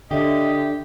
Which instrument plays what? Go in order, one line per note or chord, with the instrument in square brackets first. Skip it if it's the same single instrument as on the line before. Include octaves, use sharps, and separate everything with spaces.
[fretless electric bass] D3 [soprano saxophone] G4 [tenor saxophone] D#5 [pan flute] E5